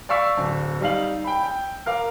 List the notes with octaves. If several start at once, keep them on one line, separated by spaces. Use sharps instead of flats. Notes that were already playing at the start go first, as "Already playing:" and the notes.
D5 F5 C#6 E6 B6
D1
G3 D#4 F5 F#7
G5 B5
G5
A#4 F5 D6